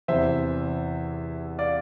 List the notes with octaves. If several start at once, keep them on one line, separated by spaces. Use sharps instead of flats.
E2 C3 E3 C5 E5
D5 F5